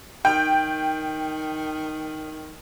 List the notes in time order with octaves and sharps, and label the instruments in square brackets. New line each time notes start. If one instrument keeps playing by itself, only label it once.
[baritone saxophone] D#3 [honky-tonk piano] G5